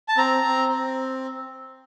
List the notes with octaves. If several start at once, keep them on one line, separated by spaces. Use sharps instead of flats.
A5
C4 A#5
C4
C4